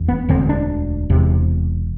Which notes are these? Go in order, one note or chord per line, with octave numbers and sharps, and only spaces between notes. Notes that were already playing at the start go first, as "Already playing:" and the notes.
Already playing: F1 E2
B3
E1 D2 D3 C4
D4
E1 E2 C3